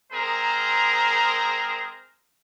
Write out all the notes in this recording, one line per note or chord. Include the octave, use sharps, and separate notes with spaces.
G#3 C4 G#4 A#4 C5 A#5